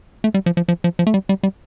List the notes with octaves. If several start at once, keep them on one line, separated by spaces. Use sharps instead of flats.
A3
G3
F3
F3
F3
F3
F3
A3
G3
G3
G3